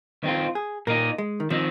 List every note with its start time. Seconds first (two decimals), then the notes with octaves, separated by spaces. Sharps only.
0.23 D#3 C4 D#4 F4
0.55 G#4
0.87 A#2 A#3 D#4 A#4
1.18 G#3
1.40 D#3
1.50 D#3 F3 C4 D#4